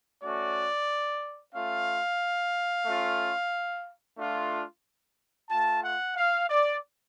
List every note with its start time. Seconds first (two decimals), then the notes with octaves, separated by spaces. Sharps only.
0.23 A3 C#4 F#4 D5
1.54 A3 C#4 F4 F5
2.86 A3 C#4 F4
4.18 A3 D4 F4
5.50 A3 F4 A5
5.83 F#5
6.15 F5
6.48 D5